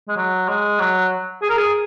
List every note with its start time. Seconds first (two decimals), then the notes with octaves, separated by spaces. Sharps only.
0.08 G#3
0.16 F#3
0.48 G#3
0.79 F#3
1.42 G#4
1.49 A#4
1.57 G#4